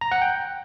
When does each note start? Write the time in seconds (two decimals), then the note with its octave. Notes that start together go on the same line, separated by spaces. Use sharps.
0.01 A#5
0.12 F#5
0.22 G5